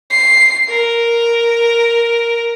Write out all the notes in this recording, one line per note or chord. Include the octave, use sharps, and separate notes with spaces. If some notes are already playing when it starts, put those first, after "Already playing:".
C7
A#4